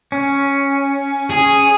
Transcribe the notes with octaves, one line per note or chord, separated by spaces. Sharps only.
C#4
G#4